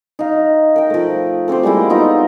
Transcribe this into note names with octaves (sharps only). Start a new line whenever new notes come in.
D#4 F5
A#4 G5
F3 A3
A3 C4 G4 C5
G3 G#3 A#3 E4
B3 D#4 F4 A4